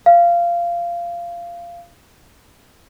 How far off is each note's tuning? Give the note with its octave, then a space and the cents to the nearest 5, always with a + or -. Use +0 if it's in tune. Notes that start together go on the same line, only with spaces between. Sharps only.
F5 -15